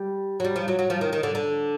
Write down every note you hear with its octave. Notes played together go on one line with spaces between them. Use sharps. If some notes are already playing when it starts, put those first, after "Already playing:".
Already playing: G3
F#3
G3
F3
F#3
F#3
F3
D#3
D#3
D3
D3